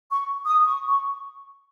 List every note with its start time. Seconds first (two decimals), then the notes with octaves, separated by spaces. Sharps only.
0.10 C#6
0.46 D#6
0.64 C#6
0.87 C#6